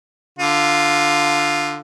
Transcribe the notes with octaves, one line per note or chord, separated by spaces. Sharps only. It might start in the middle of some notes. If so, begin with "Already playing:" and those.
D3 F4